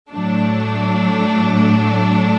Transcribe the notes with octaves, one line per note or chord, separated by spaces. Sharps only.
A2 F#3 A3 D4